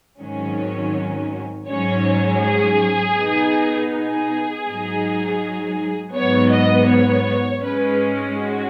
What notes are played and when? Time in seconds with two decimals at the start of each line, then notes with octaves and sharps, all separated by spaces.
0.19 G#1 G#2 D#3 F#3 C#4
1.68 G#2 F#3 C#4 C#5
2.42 G#4
3.17 B2 B3 D#4
3.91 G#4
4.66 G#2 F#3 D#4
6.15 G#2 F#3 B3 C#5
6.53 D#5
6.90 C#5
7.64 G#2 G#3 C#4 B4
8.38 F#4